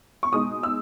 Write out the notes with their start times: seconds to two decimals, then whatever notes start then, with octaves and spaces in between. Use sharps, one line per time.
0.23 C#6
0.32 B2 G#3 D#4 D#6
0.63 E6